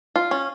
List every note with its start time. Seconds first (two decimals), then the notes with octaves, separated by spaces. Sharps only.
0.16 F4
0.31 C#4